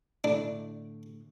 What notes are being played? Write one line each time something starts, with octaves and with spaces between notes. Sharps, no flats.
A2 D3 A3 D4